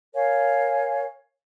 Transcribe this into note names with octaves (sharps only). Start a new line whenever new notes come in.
A#4 C#5 F5 G#5